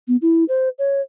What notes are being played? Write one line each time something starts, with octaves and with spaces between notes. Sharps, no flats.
B3
E4
C5
C#5